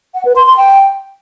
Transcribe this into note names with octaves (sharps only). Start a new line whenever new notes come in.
F#5
B4
C6
C6
G5